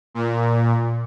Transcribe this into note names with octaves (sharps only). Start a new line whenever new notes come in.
A#2